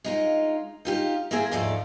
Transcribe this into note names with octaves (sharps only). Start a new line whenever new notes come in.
G#3 D#4 F4
D#4 F4 G4
A#3 C4 E4 G#4 E5
D#2 G#2 F3 A3 D5